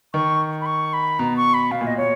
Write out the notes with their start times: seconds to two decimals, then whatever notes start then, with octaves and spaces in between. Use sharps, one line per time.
0.14 D#3 C#6
0.61 B5
0.66 C#6
0.93 B5
1.19 B2 A#5
1.37 C#6
1.54 B5
1.71 B2 F5
1.81 A#2
1.87 D#5
1.97 A#2 C#5